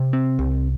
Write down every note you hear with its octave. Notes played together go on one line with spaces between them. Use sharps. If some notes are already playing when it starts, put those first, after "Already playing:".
Already playing: C3
C4
C2